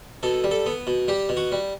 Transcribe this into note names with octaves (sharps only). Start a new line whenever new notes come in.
B2 A4
G3
A4
B3
B2
G3 G4
B2
F#4
G3